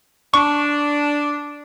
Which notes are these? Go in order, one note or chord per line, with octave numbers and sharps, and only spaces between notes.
D4 C#6